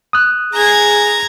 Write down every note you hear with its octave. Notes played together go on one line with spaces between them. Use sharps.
D#6 F#6
G#4 A#5 G#6